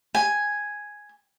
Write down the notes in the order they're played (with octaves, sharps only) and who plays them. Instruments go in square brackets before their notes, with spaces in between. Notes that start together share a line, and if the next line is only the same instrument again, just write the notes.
[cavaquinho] G#5